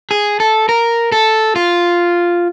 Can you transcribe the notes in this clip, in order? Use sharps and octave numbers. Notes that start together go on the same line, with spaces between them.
G#4
A4
A#4
A4
F4